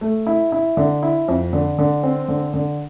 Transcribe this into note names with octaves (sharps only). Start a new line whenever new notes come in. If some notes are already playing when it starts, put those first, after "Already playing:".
A3
E4
E4
D3
E4
F2
D3
D3
C4
D3
D3